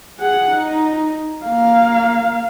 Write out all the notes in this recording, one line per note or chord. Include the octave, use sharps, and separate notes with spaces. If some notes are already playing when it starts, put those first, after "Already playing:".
G#4 F#5
D#4
A#3 F5